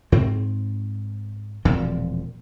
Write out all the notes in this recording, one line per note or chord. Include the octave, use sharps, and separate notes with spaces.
G#2 C4
E1 A#2 F3 C4